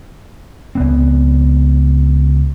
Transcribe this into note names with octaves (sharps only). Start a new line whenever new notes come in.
C#2 B3 C4